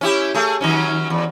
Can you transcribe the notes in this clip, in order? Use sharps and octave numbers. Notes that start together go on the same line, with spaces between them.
C#4 E4 G4
A3 G#4
D#3 F#3 C#4
E2